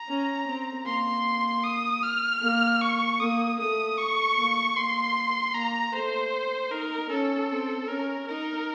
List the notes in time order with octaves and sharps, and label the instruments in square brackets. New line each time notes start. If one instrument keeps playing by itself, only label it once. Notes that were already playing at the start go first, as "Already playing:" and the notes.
Already playing: [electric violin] A#5
[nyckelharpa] C#4
C4
[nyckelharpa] A#3 [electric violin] C6
[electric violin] D#6
F6
[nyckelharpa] A#3
[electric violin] C#6
[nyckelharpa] A#3 [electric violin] D#6
[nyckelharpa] A3 [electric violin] D#6
[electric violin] C#6
[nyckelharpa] A#3
[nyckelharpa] A#3 [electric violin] C6
[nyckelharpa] A#3 [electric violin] A#5
[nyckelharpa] A3 [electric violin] C5
[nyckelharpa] D#4 [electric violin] A#4
[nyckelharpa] C#4 [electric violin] A4
[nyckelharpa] C4
[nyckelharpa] C#4 [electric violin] A#4
[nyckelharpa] D#4 [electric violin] A#4